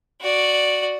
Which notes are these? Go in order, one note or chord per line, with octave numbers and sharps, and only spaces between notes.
F#4 D5